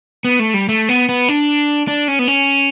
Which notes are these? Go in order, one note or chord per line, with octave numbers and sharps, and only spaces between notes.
B3
A3
G3
A3
B3
B3
D4
D4
C#4
B3
C#4